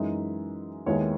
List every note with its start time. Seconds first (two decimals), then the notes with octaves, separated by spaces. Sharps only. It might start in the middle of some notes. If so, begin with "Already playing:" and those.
Already playing: F#2 E3 G#3 D#4 E5
0.86 D#2 D#3 G#3 B3 E4 C#5